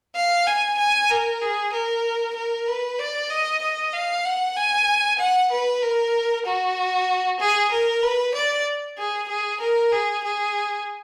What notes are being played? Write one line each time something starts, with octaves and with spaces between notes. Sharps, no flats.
F5
G#5
G#5
A#4
G#4
A#4
A#4
B4
D5
D#5
D#5
F5
F#5
G#5
F#5
B4
A#4
F#4
G#4
A#4
B4
D5
G#4
G#4
A#4
G#4
G#4